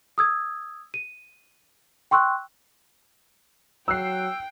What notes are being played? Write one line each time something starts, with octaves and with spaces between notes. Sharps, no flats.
D#6 E6 G#6
D#7
G5 C6 C#6 E6 F#6
F#3 G5 E6 F#6 C7